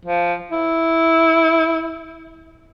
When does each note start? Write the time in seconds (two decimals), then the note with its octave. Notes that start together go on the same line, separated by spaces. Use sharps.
0.05 F3
0.52 E4